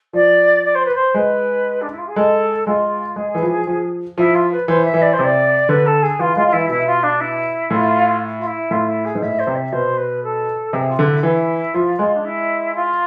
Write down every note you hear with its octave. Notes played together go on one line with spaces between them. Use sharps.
F3 D5
D5
C5
B4
C5
G#3 B4
D4
E4
F4
G#4
G#3 A4
G#3 F4
G#3 G#4
E3
F3
F3
F3 E4
F4
B4
E3 C5
E5
E3
D5
C5
C3
D5
D3 B4
A4
G#4
E3 F4
G#3 F4
F4
E3 E4
B2 E4
F4
D4
E4
A2 F4
F4
E4
A2 F4
E4
G#4
G#2
A2 E5
C5
C3
E5
B2 C5
B4
A4
C3 G#4
F4
D3
E4
E3 E4
F3 F4
G#3
D4
E4
F4